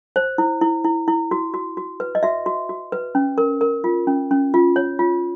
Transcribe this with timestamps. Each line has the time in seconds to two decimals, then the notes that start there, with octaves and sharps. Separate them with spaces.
0.16 C5
0.38 E4
0.61 E4
0.84 E4
1.08 E4
1.31 F#4
1.54 F#4
1.77 F#4
2.00 B4
2.15 D#5
2.23 F#4 E5
2.46 F#4
2.69 F#4
2.92 B4
3.15 C#4
3.38 A#4
3.61 A#4
3.84 F4
4.07 C#4
4.31 C#4
4.54 F4
4.76 C#5
4.99 F4